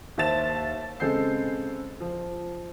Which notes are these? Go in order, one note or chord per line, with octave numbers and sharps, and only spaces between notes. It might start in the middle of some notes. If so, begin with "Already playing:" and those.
D#2 C5 E5 A5 A6 E7
C#3 G#3 C4 A4 G6 C7
F3